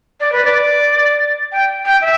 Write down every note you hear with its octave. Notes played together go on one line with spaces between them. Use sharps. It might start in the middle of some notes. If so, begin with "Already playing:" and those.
D5
B4
D5
G5
G5
E5